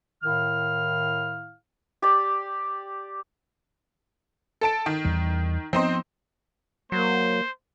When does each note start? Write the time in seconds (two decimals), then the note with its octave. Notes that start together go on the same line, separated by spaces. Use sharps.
0.23 A2 D#3 E4 F5 F6
2.02 G4 D5
4.61 A4 A5 D7
4.86 D#3
5.05 E2 G3
5.73 F3 B3 C4 D#4 C5
6.92 F#3 A#3 C5